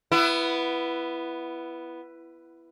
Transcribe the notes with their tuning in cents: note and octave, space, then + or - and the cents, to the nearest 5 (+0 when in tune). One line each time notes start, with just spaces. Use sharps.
B3 +0 E4 +20